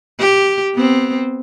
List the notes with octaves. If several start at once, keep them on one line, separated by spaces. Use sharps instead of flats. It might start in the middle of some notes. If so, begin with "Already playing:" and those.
G4
B3 C4